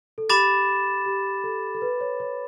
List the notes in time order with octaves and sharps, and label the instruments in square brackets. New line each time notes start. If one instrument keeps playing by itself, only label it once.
[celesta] A4
[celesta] G4 [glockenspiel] B5 D6 A6 E7
[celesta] G4
A4
A4
B4
C#5
C#5